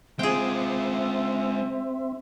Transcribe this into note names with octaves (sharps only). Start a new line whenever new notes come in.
G#3 C4 F4 G#4 E5 G5